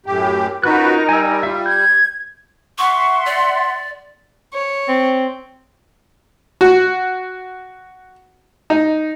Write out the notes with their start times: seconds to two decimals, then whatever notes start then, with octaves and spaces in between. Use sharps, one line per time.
0.06 F#2 A2 G4
0.63 C#4 D#4 F4 F#4 A#4 B4 F#6
1.09 G3 G#5 E6
1.43 F4 E5
1.66 G6 G#6
2.78 E5 F#5 C6 C#6
3.26 D5
4.54 C#5
4.89 C4
6.61 F#4
8.70 D#4